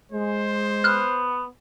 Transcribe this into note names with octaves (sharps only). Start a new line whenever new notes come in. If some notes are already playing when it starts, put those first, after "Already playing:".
G#3 C5
B3 F6 F#6